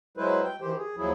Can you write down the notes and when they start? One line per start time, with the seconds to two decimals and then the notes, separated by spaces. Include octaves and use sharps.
0.17 F#3 G#3 E4 B4 C5
0.45 G5
0.62 D#3 E3 G4 C5
0.77 G#4
0.97 D#2 F3 F#3 E4 G#4